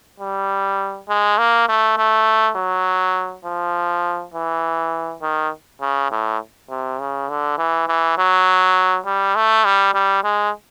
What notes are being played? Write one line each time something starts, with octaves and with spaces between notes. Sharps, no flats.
G3
G#3
A#3
A3
A3
F#3
F3
E3
D#3
C#3
A2
C3
C#3
D3
E3
E3
F#3
G3
A3
G3
G3
G#3